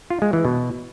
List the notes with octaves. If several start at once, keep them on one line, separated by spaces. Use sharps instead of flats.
F4
G#3
E3
B2